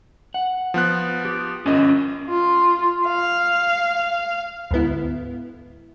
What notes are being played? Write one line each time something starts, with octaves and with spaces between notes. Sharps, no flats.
F#5
F3 B3 F#6
G4
G1 C#4 F4 A#4 D#5
F4
F5
D2 G#2 B3 E4